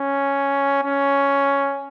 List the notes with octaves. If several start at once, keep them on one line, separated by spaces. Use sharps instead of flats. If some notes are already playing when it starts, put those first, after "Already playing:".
Already playing: C#4
C#4